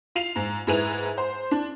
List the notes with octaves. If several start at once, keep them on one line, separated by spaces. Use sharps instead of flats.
F4 C7 F7
G#2
G#2 E4 G#4 B4 F7
C5
D4